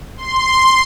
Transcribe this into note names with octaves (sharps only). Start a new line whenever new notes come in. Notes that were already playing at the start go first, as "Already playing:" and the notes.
C6